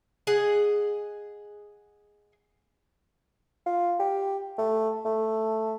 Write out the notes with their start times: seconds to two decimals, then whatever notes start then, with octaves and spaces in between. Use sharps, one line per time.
0.27 G#4 D#5 F#5
3.67 F4
4.00 G4
4.58 A3
5.06 A3